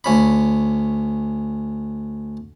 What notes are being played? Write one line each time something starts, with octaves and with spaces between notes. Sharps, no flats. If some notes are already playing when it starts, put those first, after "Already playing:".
D2 C#4 B5